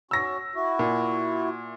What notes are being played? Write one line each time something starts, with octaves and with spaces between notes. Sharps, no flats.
C#4 F#4 E6 A#6
E4 F#4
A#2